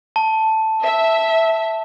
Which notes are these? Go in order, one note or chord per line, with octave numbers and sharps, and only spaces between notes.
A5
E5